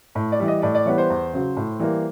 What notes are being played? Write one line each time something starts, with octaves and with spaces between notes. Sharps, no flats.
A2
D5
E3 G3
D#5
A2 D5
D5
E3 G3 B3 C#5
C5
E2
C#3 F#3
A2
E3 G3 A#3